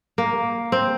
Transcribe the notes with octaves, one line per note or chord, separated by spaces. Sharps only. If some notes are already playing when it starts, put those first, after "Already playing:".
A#3
C4